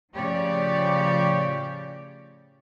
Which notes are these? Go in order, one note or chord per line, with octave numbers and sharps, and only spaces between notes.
A2 C#3 F3 G4 C#5 D5